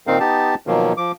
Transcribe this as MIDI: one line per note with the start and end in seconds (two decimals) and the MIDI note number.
0.07 0.19 46
0.07 0.19 51
0.07 0.19 60
0.07 0.19 63
0.07 0.19 77
0.20 0.55 59
0.20 0.55 63
0.20 0.55 67
0.20 0.55 81
0.67 0.93 47
0.67 0.93 51
0.67 0.93 53
0.67 0.93 54
0.67 0.93 58
0.97 1.12 53
0.97 1.12 86